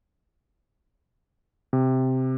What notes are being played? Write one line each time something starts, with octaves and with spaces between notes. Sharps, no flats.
C3